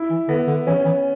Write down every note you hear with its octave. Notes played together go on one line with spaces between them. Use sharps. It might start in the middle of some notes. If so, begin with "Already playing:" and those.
Already playing: E4
E3
D3 B3
D3
E3 C#4
E3